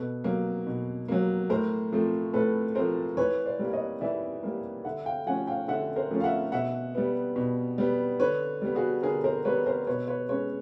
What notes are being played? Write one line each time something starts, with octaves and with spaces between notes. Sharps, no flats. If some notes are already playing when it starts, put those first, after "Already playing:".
Already playing: B2 A4 B4
F#3 A#3
B2
F#3 A#3
A2 A#4 C5
F3 A3 C4
A2 A4 B4
F3 A3 C4 A#4 C5
E3 B4 C#5
C5 D5
G3 A#3
C#5 D#5
E3 D5 E5
G3 A#3
D3 E5 F#5
F5 G5
F3 A3 C#4 F#5 G#5
F5 G5
D3 E5 F#5
A#4 C5
F3 A3 C#4
F5
E5 F#5
B2 E5 F#5
G3 B3
B2
G3 B3
D3 B4 C#5
G3 B3
F#4 G#4
D3 G#4 A#4
A#4 C5
G3 B3 B4 C#5
A#4 C5
B2 B4 C#5
B4 C#5
G#3 C#4 B4 C#5